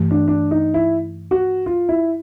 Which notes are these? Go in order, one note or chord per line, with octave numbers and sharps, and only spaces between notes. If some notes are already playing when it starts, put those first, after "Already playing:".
Already playing: G2 E3 A3
D4
D4
D#4
E4
F#4
F4
E4